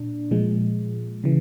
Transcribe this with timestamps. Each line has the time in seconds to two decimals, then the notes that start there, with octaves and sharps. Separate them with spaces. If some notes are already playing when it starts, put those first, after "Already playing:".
Already playing: A#2 D4
0.31 A#2 F3 G#3
1.24 C#3 E3